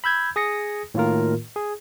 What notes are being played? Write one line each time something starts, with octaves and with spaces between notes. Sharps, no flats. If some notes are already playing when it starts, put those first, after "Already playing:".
B5 E6 G6 G#6
G#4 D#6 A#6 C#7
A2 D#3 A#3 F4 A#4
G#4